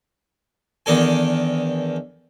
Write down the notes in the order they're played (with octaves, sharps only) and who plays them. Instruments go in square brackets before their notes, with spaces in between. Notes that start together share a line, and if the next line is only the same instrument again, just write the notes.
[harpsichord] E2 D#3 D4 A4 G#5